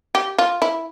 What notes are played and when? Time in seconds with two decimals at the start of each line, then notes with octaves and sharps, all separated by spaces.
0.15 G4
0.38 F4
0.62 E4